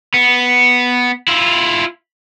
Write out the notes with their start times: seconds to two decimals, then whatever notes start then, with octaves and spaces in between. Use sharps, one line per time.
0.14 B3
1.28 E4 F4